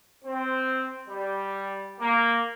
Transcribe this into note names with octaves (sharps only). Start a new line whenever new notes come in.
C4
G3
A#3